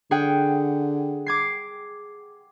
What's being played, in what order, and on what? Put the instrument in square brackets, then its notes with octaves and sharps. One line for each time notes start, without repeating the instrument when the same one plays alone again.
[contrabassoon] D3 [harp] G#4 F#5 G5
[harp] D6 G#6 C7